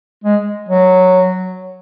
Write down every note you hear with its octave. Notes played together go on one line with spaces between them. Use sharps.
G#3
F#3